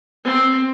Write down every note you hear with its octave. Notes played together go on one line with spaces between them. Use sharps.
C4